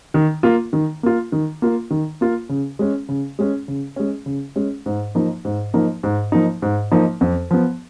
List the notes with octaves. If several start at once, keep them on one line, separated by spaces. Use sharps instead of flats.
D#3
A#3 F4
D#3
A#3 F4
D#3
A#3 F4
D#3
A#3 F4
C#3
G#3 C#4
C#3
G#3 C#4
C#3
G#3 C#4
C#3
G#3 C#4
G#2
F3 A#3 D#4
G#2
F3 A#3 D#4
G#2
F3 A#3 D#4
G#2
F3 A#3 D#4
F2
F3 B3